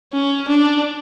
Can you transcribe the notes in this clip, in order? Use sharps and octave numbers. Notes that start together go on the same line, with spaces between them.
C#4
D4